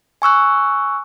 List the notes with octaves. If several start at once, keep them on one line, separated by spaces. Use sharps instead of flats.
G#5 C#6 E6 F#6